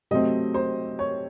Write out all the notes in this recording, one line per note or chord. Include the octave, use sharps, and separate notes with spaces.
C3 F#3 A3 C4 D#5
C5
C#5